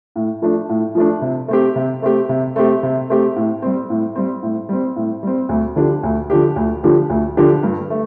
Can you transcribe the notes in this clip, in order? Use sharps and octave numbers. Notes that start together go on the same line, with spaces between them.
A2
F3 A3 D4
A2
F3 A3 D4
C3
A3 C4 G4
C3
A3 C4 G4
C3
A3 C4 G4
C3
A3 C4 G4
A2
G3 C4
A2
G3 C4
A2
G3 C4
A2
G3 C4
D2
D3 F3 D4 G4
D2
D3 F3 D4 G4
D2
D3 F3 D4 G4
D2
D3 F3 D4 G4
G2
A3